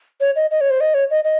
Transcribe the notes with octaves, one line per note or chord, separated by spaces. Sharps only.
C#5
D#5
D#5
C#5
C5
D#5
C#5
D#5
D#5